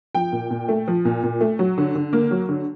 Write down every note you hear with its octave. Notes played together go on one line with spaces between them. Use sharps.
F3 G5
A#2
A#2
A3
F3
A#2
A#2
A3
F#3
D3
D3
A#3
F#3
D3